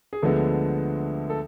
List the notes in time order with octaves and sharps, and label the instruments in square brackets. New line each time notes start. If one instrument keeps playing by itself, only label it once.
[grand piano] G#4
D2 D3 F3 G#3 B3 A4
A4